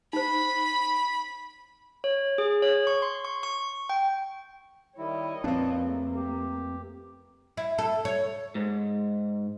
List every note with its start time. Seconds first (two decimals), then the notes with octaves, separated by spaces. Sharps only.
0.13 D#4 C5 B5
2.04 C#5
2.38 G#4
2.62 C#5
2.87 C#6
3.02 C6
3.25 C#6
3.43 C#6
3.89 G5
4.98 D#3 G3 E4 C#5 D#5
5.44 F2 A#2 A#3 C4 D4 B4 A5
5.82 C#3 A3 A#3
6.16 G4
7.57 E4
7.78 A4
8.05 C#5
8.55 G#2